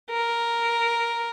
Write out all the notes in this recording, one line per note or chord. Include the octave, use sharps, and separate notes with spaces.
A#4